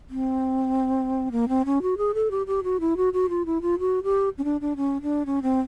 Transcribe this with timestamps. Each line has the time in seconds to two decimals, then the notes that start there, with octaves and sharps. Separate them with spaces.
0.10 C4
1.32 A#3
1.49 C4
1.65 C#4
1.82 F#4
1.98 G#4
2.14 A4
2.31 G4
2.47 G4
2.63 F#4
2.80 E4
2.97 F#4
3.13 F#4
3.29 F4
3.46 E4
3.62 F4
3.79 F#4
4.03 G4
4.38 C#4
4.44 D4
4.61 D4
4.77 C#4
5.02 D4
5.26 C#4
5.43 C4